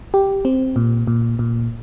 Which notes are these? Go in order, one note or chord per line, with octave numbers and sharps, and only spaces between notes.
G4
C4
A#2
A#2
A#2